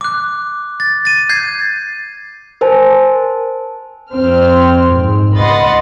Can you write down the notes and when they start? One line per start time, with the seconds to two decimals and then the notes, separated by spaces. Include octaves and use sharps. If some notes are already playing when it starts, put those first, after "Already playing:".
0.01 D6 F#6
0.80 A6
1.05 A6 D#7
1.29 G6 G#6 C7
2.61 A#4 C5 G#5 A5
4.11 F2 C4 F6
4.92 G#2
5.35 C#2 D#5 F#5 B5 C6 A6